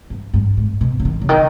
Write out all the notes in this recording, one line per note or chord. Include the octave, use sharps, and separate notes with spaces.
G2
G2
G#2
B2
C#3
D#3
C#3
D#3